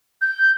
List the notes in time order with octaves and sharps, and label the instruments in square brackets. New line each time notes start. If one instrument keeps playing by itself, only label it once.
[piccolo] G6